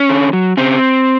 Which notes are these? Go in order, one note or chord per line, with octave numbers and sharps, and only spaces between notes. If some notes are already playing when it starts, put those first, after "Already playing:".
Already playing: C#4
D3
F#3
C#3 C4